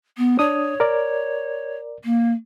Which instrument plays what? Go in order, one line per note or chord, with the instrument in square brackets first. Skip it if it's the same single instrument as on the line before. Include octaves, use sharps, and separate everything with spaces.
[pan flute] B3
[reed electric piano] D4 D#6 [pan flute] C#5
[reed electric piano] A#4 D5
[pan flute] A#3